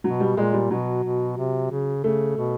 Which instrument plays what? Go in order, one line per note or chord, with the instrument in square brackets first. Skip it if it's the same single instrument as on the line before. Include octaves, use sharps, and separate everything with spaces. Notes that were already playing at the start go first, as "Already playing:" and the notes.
[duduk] B2 [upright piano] F#3
[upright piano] G3
[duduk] A#2 [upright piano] G#3
[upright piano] G3
[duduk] B2 [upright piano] F#3
[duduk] B2
C3
C#3
[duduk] C#3 [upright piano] A3
[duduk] B2